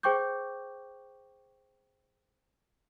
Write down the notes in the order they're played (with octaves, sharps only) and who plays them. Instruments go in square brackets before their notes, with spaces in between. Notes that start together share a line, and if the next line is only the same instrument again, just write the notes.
[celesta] G#4 C5 G5 C#6 D6 G6